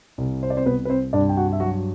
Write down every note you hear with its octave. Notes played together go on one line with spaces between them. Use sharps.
C2
C5
D5
C4 C5
C2 B3 B4
B4
C4 C5
G2 D4 D5
G5
F#4 F#5
E5
F#3 F#4 F#5